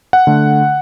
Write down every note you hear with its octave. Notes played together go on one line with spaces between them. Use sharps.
F#5
D3 A3